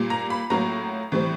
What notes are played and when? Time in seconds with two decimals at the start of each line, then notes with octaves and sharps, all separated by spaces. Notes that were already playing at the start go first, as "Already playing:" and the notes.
Already playing: A#2 G3 A#3
0.10 A#5
0.30 B5
0.50 A2 F#3 A#3 A#5
1.12 A2 E3 G3 C4